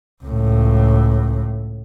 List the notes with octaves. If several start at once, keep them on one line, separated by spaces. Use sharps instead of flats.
C#2 A2